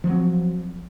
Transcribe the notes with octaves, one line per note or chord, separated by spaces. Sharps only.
F3 F#3 C4